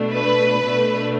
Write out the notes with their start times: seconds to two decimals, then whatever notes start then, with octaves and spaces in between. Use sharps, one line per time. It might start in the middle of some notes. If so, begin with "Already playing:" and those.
Already playing: B2 A3 D4
0.12 B4
0.63 B2 A3 D4